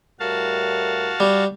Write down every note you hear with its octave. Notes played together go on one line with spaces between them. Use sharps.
A2 G3 F#4 A#4 F5 A5
G3